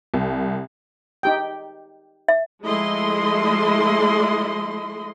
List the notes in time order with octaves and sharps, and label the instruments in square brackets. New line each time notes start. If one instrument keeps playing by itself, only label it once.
[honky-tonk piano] C2
[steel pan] D#4 G4 G5
[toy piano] E5
[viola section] F3 G#3 A3 E4 D#5 C6